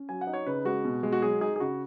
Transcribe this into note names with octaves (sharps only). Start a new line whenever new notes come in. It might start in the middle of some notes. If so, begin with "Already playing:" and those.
Already playing: C#4
F#3 G#5
F#5
D#4
C#5
C#3 B4
G#3 F#4
B2
G#3
F#4
F#3 G#4
D#4 G#4
G#4
C#3 F#4